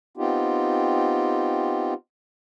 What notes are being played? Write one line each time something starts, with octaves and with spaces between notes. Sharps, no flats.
B3 C4 D#4 F4 G4